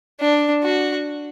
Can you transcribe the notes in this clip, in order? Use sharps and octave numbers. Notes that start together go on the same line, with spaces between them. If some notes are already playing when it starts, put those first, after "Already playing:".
D4
F#4